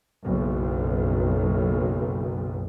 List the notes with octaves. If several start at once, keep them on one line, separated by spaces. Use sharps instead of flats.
F#1 B1